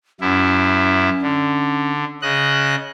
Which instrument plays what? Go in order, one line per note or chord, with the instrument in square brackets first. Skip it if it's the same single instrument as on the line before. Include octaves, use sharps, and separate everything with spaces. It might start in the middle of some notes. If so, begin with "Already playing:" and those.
[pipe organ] F#2 E4 [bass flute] C#4
[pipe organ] D3
C#3 D#5 F#6